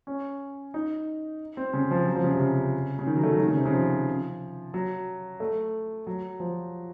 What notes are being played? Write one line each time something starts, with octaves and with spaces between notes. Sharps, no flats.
C#4
D#4
C4
C#3
F3
F#3
F3
C#3
C3
C#3
C#3
D#3
F#3
A3
F#3
D#3
C#3
C3
C#3
F3
F#3
A3
F#3
F3